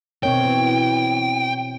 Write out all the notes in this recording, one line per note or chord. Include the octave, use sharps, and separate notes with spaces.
B2 D#3 C4 C#5 G5
E3